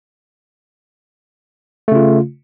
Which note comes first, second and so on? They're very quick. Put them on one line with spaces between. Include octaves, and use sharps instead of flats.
A3 C#3 F4